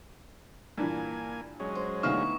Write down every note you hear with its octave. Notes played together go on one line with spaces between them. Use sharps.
G2 A#2 E3 A#3 G#5
F#3 G#3 C#4
C5
D2 B3 D#4 E4 F5 C#6 F6